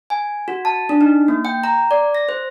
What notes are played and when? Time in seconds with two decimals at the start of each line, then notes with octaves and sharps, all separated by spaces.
0.10 G#5
0.48 F#4
0.65 A5
0.89 D4
1.01 D#4
1.28 A#3
1.45 G5
1.64 A#5
1.91 D5
2.15 A#6
2.29 C5